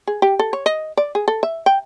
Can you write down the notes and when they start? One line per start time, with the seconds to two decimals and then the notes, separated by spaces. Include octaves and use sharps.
0.07 G#4
0.22 G4
0.39 A4
0.53 C#5
0.66 D#5
0.97 D5
1.15 G#4
1.28 A4
1.43 E5
1.66 G5